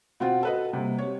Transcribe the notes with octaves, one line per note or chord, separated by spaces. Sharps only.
B2 C4 F4 F#5
F#4 A4 B4 D#5
C3 G3 A#3
C4 G4 C#5